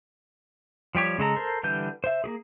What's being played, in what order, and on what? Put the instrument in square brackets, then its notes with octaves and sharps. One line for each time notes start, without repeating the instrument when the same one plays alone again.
[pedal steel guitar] F3 G3 G4 C#5
C#3 G#3 A4 A#5
A4 A#4 C5
D3 E3 G3 B4 G6
C5 E5
A#3 G4 G#4